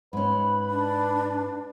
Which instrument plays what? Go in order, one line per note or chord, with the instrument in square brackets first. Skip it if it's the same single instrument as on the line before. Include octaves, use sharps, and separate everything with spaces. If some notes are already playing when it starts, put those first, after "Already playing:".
[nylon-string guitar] G#2 C#4 [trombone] B4 [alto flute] B5
[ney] D4